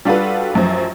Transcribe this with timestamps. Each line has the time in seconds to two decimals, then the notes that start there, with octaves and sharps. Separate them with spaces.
0.05 G3 D4 F4 F#4 A4 B4
0.53 A1 F#2 F3